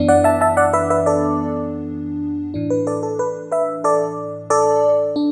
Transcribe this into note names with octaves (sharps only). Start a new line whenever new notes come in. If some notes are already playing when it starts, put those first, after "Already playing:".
Already playing: F#2 E3 B3 D4
D5 F#5
E5 A5
E5 A5
D5 F#5
B4 E5
B4 E5
A4 D5
A2 E3 D4
B4
A4 D5
A4
B4
B4 E5
A4 D5
A4 D5
D4